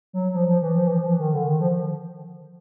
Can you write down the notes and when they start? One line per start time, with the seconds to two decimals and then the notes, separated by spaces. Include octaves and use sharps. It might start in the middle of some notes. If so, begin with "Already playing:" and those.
0.13 F#3
0.34 F3
0.48 F3
0.62 E3
0.76 F3
0.87 E3
0.98 F3
1.19 D#3
1.33 D3
1.47 D#3
1.60 F3